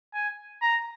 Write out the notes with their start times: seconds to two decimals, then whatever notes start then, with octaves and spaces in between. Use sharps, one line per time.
0.14 G#5
0.62 A#5